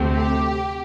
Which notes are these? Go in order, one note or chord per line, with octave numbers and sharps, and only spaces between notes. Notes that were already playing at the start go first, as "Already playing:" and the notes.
Already playing: D2 C3 A3 C4
G4